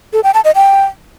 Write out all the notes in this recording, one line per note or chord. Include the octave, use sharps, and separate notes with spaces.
A4
G5
A5
D#5
G5